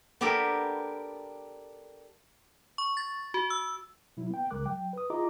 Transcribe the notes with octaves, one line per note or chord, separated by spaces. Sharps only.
B3 D4 G4 A4 A#4 B5
C#6
A6
F#4
E6
B2 F#3 E4
B3 G5
C#2 C#3 G#3 A#4 D6 F#6
F#3 G5
B4 D#6
E4 F4 G#4 D#5 A#5 D6